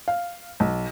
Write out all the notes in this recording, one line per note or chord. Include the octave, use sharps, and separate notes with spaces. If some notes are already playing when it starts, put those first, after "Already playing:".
F5
B1